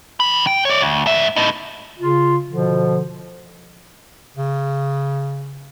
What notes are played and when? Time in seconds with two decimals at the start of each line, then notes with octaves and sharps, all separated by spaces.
0.20 D#3 B5
0.47 G5
0.65 C#5 D5
0.81 D2
1.06 G#2 E5
1.36 A2 D#4
1.99 C#3 F4
2.49 B2 D3 F3
4.37 C#3